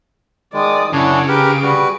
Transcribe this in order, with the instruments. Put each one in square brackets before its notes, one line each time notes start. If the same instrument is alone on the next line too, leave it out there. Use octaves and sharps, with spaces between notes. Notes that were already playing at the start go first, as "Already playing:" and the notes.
[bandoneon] D#3 G#3 [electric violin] D5 D#6
[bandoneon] F#2 D4 C#5 [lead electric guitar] C#3 [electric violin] E4 F#5
[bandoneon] G4 A#4 B4 [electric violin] G#4 D7
[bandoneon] G3 F#4 B4